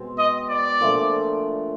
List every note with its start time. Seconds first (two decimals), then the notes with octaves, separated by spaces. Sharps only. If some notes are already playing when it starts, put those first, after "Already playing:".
Already playing: B2 G#3 C4
0.18 D#5
0.49 D5
0.81 A#2 F3 A3 D4